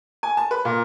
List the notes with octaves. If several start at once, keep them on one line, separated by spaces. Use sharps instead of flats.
G#5
A5
B4
A#2